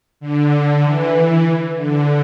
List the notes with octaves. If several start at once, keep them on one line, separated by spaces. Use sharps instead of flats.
D3
E3
D3